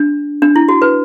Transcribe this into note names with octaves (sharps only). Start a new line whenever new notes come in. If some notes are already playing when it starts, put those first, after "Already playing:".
Already playing: D4
D4
E4
F#4
B4